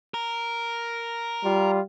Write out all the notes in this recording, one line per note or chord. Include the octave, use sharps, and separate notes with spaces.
A#4
G3 F4